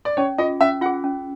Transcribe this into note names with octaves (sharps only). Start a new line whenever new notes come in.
D5
C#4 C#5
F4 G#4 D#5
C#4 E5
F4 G#4 F#5
C#4